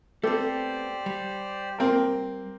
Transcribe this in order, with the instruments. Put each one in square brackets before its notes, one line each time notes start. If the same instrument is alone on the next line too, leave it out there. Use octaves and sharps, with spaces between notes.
[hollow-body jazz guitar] A3 B3 C4 [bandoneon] G4 C5 D5 [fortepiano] A4
[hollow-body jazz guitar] G3
[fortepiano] A#3 C4 A#4